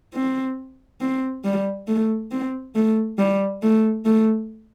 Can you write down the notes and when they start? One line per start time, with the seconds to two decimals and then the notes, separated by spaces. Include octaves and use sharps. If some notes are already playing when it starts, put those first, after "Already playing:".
0.14 C4
1.01 C4
1.44 G3
1.88 A3
2.31 C4
2.75 A3
3.18 G3
3.62 A3
4.05 A3